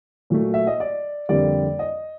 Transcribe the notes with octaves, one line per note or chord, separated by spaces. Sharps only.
A#2 F#3 A3
E5
D#5
D5
F2 D3 G3 A#3 D5
D#5